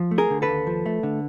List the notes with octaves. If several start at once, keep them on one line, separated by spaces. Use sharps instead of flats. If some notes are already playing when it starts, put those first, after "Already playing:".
Already playing: F3
A3
G#4 A#4
D3
A4 B4
D#2
F3
A3
D3